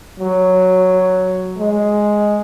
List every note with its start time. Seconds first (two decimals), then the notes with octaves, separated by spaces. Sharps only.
0.20 F#3
1.58 G#3